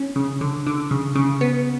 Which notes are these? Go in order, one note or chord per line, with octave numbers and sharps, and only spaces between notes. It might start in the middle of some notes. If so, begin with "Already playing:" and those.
Already playing: C#4
C#3
D3
D3
C#3
C#3
B3